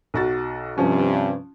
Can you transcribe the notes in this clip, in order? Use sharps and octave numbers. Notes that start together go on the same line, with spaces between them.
B1 F#4 A6
G2 C3 F3 C#4